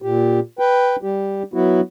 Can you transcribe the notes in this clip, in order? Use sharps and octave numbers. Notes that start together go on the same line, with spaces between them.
A#2 G4
B4 G5
G3 G4
F#3 B3 E4 F#4